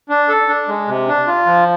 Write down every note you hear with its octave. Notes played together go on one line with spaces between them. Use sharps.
D4
A4
D4
G#3
C3
D4
F4
F3